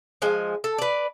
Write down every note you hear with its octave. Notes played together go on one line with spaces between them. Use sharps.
F3 G#3 G#5
A4
B4 D5